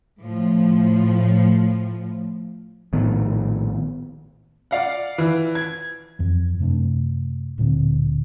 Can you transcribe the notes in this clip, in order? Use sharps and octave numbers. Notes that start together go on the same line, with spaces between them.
A2 F3
A#1 A2 D#3 B3
D5 F5 F#5
E3
G#6
F2 E3
F#2 C3 A3 D4
D1 A#2 D3 C4